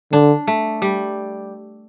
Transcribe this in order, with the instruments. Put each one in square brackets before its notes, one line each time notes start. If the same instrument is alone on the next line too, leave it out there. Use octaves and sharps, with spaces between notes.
[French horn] D3 [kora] D4
[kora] A3
G3